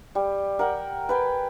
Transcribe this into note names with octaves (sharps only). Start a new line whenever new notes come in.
G3
A#4 F#5 G5
B4 G5 G#5